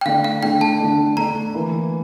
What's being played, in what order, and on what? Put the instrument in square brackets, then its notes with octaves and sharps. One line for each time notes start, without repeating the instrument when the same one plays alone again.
[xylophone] G5
[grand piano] D3 A3 D4 [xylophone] F5
[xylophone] F5
[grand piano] D3 A3 D4 [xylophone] G5
[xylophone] A5
[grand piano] D3 A3 D4
[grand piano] D3 A3 D4 [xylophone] A#5
[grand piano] E3 A#3 E4